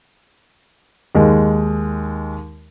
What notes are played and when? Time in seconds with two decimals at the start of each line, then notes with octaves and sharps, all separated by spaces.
1.15 D#2 G#3